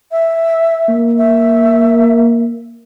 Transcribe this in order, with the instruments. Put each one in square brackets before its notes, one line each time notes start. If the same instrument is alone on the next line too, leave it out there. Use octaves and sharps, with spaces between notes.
[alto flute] E5
[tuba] A#3
[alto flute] E5